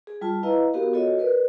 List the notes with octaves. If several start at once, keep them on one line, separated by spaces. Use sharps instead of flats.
G#4
G3 F4 A5
E4 B4 D#5 F5 A#5
B3 F#4 G4 A#4 F5
F4 F#4 A4 C#5 D#5
A#4 B4 D5